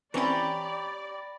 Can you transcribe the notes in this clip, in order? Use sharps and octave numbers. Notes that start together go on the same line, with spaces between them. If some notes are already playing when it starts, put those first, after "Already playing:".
E3 C4 C#4 G4 C#5 D5 A#5 B5